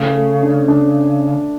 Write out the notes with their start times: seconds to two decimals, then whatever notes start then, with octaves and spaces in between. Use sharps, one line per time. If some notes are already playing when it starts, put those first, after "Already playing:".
Already playing: C#3 A3
0.16 A3
0.43 D4
0.68 D4